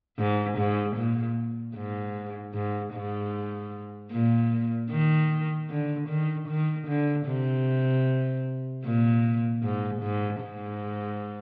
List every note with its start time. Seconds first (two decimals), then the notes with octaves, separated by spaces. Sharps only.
0.18 G#2
0.58 G#2
0.97 A#2
1.75 G#2
2.54 G#2
2.93 G#2
4.12 A#2
4.90 D#3
5.69 D3
6.08 D#3
6.48 D#3
6.88 D3
7.26 C3
8.84 A#2
9.63 G#2
10.02 G#2
10.42 G#2